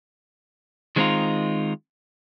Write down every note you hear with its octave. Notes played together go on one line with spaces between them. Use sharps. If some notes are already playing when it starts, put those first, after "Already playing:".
D#3 G#3 C4 C#4 D#4 F4